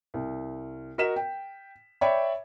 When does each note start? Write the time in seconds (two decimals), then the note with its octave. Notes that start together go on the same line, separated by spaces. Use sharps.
0.14 C2
0.98 F#4 A#4 D#5 B6 E7
1.16 G5
2.01 C#5 D5 E5 G5 B5